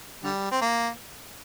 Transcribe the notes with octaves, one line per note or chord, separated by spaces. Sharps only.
D3 G3
C4
A#3